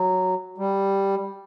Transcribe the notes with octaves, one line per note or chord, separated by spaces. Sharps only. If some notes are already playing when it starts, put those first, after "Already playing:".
Already playing: F#3
G3